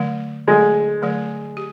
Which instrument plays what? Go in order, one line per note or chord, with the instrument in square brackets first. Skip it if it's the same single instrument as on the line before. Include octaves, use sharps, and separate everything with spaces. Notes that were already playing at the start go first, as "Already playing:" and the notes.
Already playing: [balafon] D3 F#3 A3
[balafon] D3 F#3 A3 [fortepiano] G#3
[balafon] D3 F#3 A3
G4